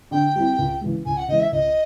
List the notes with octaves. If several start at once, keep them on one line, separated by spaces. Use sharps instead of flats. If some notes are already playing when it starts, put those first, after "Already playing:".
D3 G5
G3 C4 E4
C#2
C#3 E3 G#3
C#2 G#5
F#5
C#3 E3 G#3 D#5
E5
C#2 D#5